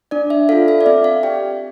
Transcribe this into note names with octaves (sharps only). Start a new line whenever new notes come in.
D4 D5
E5
F4 A4 F5
E5
D5
C4 E5
F5
G4 G5